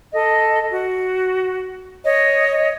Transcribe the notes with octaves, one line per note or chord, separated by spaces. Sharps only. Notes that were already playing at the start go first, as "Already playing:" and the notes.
A4 D#5
F#4
C#5 D#5